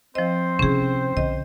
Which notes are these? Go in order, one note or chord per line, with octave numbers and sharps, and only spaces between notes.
F3 C4 C5 D#5
C3 C#4 E4 G#4
B1 D3 D#5